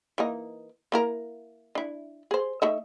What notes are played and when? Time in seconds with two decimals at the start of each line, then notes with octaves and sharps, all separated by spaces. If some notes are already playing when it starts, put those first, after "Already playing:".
0.18 E3 A#3 D#4
0.92 A#3 E4 A#4
1.75 D4 E4
2.31 G#4 C5
2.62 A3 D#4 E5